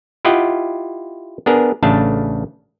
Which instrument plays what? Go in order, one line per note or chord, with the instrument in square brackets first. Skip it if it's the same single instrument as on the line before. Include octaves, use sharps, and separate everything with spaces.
[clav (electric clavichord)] E4 F4 G4 D#5 F#5 G5
B3 D4 G#4 A#4
A1 C#3 A3 D4 F5 A5